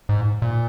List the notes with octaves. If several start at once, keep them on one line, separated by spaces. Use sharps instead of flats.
G#2
A#2